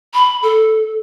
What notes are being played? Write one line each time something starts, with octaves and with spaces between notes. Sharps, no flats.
B5
A4